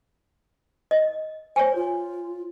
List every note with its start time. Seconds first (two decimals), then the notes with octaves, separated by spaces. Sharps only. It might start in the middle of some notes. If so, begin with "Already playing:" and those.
0.91 D#5
1.56 C5 C#5 G#5
1.76 F4